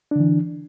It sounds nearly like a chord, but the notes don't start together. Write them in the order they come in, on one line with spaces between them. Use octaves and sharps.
D4 D3 E3